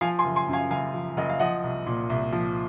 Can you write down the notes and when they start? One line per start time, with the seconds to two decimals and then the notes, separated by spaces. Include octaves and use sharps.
0.01 F3 F5 G#5
0.19 G#5 C6
0.24 F#1
0.36 G#5 C6
0.48 F#2
0.53 F5 G#5
0.71 F#1 F5 G#5
0.94 F3
1.17 F#1 D#5
1.30 F5
1.39 F3 D#5 F#5
1.63 C2
1.86 A#2
2.10 C2
2.33 F3